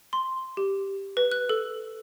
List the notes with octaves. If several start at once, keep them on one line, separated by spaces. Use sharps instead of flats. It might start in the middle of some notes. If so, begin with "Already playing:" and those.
C6
G4
B4
F#6
A4